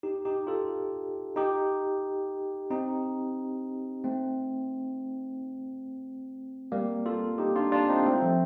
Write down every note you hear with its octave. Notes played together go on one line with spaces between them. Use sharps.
D#4 G4
D#4 G4
F4 A4
D#4 G4
C4 D#4
A3 C4
G3 A#3
F4 A4
D#4 G4
D4 F4
D4 F4
C4 D#4
A3 C4
F3 A3